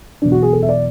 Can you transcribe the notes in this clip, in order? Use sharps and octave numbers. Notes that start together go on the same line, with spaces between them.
E1 E2 B2 F#3 D4
F#4
G#4
A4
E5
D5